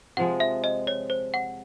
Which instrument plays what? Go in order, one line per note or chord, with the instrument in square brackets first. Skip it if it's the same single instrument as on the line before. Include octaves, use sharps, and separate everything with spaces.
[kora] C3 F3 G#3 [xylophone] F#5
[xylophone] E5
D#5
C#5
C5
F#5